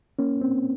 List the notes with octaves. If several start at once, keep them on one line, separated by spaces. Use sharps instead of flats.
A#3 C#4
C4